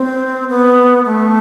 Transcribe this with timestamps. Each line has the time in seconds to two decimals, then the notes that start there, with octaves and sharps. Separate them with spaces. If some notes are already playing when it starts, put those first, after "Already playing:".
Already playing: C4
0.49 B3
1.06 A3